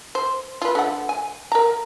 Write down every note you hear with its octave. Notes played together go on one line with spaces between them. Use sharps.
C5
F4 B4
D3 A3 F#5
G#5
A#4 A#5